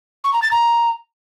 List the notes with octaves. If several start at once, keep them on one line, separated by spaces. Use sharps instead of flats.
C#6
A#5
A6
A#5